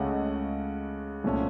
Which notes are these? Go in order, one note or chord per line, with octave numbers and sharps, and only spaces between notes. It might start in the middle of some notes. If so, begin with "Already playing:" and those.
Already playing: C#2 C#3 A3 C#4 D#5 F#5
C2 A#2 A3 C#4